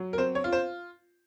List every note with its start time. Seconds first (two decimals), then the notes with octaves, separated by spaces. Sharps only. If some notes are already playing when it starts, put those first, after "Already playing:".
Already playing: F#3
0.13 A#4
0.18 C4 C5
0.35 C#5
0.44 F4
0.52 C5